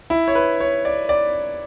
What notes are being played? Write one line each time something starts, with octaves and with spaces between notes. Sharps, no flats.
E4
C#5
B4
C#5
D5
D5